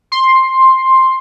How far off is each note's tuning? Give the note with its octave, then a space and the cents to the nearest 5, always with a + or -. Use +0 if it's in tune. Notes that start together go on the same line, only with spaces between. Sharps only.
C6 +10